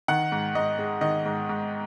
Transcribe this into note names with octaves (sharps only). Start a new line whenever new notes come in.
D#3 F#5
G#2
G#2 D#5
G#3
D#3 D#5
G#2
G#2